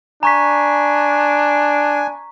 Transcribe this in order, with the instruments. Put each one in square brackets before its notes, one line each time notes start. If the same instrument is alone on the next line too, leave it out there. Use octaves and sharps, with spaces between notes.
[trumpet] D4 [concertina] G#5 [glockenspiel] A#5 C#6 B6